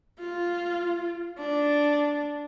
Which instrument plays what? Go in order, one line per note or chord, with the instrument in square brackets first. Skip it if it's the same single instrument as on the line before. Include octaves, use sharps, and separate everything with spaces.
[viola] F4
D4